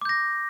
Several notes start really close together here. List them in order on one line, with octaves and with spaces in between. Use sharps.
D6 G6 A#6